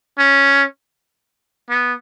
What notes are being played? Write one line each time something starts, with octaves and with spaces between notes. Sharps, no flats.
C#4
B3